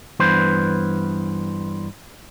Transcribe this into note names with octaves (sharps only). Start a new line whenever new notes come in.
G2 E3 B3 B4 C5